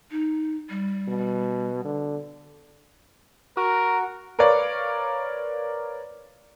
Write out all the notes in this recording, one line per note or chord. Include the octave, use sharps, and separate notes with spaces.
D#4
G3
B2
D3
F#4 A#4
A#4 B4 C#5 D5 F5